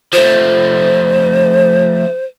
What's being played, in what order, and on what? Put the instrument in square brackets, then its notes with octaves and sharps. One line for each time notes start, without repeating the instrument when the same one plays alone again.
[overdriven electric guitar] F3 A3 [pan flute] C5